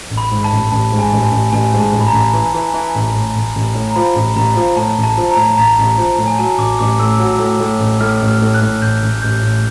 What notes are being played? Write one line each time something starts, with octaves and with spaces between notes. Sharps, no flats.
A1
B5
G#2
A5
A1
A1 A5
G#2
G#5
A1
A5
A1
A1 G#5
G#2
A5
A1
B5
A#5
A1
E3
E3
E3
A1
A2
A1
A1
A2
A#5
F3 B5
A1
A1 A#5
F3
A2 A5
A1
A5
F3
A#5
A2
A1 A#5
A1
F3
A2
G#5
F#3 A5
A1 D6
A1 D6
A2 E6
F#3
A2
A2
A1
A2 F6
A1
F6
A2
F#6
A2
A1 G6
A1
A1 G6
A2